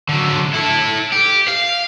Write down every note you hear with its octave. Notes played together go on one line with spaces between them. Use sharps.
D3 F#3
E4 A4
G4
F5